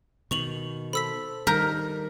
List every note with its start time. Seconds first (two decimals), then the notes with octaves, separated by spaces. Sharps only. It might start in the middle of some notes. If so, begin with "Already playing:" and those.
0.31 B2 D#3 C#6 F7 F#7
0.93 A4 C5 B5 E6 B6
1.47 D#3 G3 D#4 A#4 G6 B6